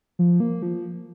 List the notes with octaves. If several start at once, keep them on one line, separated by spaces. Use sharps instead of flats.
F3
A#3
F3